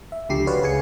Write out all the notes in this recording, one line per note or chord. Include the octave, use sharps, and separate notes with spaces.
E5
C#2 D3 F3 G4 C7
F#4 B4 C#5 D5 F5
C#2 G#4 G#5 C#7